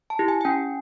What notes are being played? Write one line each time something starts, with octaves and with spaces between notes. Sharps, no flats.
A5
E4 G4
G#5
G#5
C#4 G5